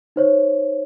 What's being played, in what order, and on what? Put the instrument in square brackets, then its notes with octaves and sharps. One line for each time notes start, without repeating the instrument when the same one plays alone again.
[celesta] D#4 C5 C#5